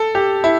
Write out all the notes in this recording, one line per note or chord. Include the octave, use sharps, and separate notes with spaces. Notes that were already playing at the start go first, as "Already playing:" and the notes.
Already playing: A4
G4
E4